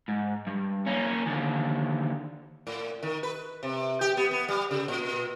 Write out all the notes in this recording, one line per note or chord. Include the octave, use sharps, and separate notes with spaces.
G#2
G2
A#3 C#4
D#2 D3
A2
D#3
B4
C3
G4
B3
B3
G3
C#3
A#2